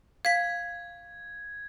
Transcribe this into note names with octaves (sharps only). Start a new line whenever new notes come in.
F5 G#6 B6